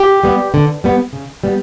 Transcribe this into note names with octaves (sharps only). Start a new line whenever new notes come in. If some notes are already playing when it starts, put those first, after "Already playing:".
Already playing: G4
G3 B3
D3
G3 B3
C#3
G3 B3